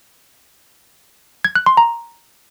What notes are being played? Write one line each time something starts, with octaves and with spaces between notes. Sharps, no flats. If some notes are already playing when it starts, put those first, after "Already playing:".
G#6
F#6
C6
A#5